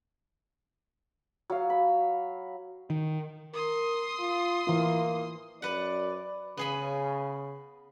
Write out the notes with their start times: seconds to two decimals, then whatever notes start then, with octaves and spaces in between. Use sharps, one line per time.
1.50 F#3 F5
1.70 B5
2.90 D#3
3.54 A#4 C6 D#6
4.19 F4
4.67 E3 A#3 F4
5.62 F#2 B4 D5 F#5
6.57 C#3 B3 G#4 B5